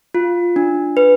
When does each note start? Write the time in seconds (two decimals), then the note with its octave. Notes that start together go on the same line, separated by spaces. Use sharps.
0.14 F4
0.56 D4
0.97 B4